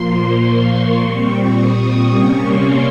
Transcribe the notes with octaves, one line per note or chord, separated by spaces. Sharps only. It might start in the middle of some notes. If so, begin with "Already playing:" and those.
Already playing: A#2 F3 A#3 C6
C#6
A#2 G3 C4
D#6
C3 G3 A#3 C#4 C#6
C6